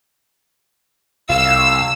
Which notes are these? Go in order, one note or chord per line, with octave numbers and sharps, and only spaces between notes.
C2 F5 E6